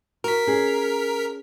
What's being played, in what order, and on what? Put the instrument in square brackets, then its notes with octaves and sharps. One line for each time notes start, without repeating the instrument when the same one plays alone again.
[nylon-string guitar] F#4 [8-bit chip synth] A#4 B6
[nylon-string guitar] C#4 G#4